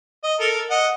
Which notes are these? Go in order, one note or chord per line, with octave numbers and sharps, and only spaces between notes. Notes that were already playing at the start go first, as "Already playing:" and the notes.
D#5
A4 A#4
D#5 F#5